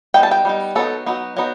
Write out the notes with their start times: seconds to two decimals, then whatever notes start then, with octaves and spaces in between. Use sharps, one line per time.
0.14 G3 B3 D#4 G5
0.23 A5
0.31 G5
0.45 G3 B3 D#4
0.75 F#3 B3 D#4 A4
1.06 F#3 B3 D#4
1.37 F#3 B3 D#4